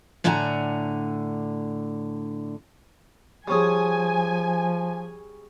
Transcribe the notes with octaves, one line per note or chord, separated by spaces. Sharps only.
A2 D3 D4 F#5 G#5 A#5
F3 G3 C#4 G#4 G#5